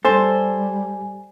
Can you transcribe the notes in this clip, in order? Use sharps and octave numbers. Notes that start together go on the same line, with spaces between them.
G3 A4 C5 G#5